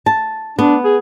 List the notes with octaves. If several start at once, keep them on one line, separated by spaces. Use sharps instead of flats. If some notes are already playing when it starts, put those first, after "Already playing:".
A5
B3 D4
G#4